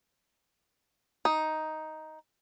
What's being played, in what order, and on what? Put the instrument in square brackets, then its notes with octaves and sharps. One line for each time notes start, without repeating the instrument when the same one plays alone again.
[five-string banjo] D#4